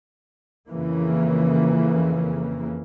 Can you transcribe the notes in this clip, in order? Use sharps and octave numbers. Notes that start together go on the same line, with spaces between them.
F2 C#3 E3 A#3